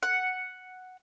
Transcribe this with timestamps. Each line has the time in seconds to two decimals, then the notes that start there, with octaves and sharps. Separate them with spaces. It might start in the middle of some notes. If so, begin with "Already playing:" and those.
0.03 F#5